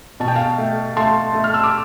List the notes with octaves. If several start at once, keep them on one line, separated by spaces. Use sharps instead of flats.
B2 A5
G5
F5 A5
A3
A3 A5 C6
A3
F6
E6
D6